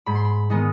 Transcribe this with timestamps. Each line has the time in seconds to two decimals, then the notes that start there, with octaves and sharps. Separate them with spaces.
0.06 G#2 B5
0.15 C6
0.25 B5
0.50 D#3 G#3 B3 D#4